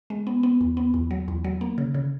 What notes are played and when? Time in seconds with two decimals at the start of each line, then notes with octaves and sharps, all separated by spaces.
0.10 G#3
0.27 B3
0.43 B3
0.61 E2
0.77 B3
0.94 E2
1.11 F#3
1.28 E2
1.44 F#3
1.61 A#3
1.78 C#3
1.94 C#3